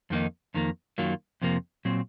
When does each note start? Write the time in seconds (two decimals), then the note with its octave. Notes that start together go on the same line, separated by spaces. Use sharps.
0.10 F2 D#3 A#3 D#4
0.54 F2 D#3 A#3
0.98 F#2 D#3 F#3 A#3 F4
1.42 F2 C3 F3 A#3
1.85 A#2 F#3 C4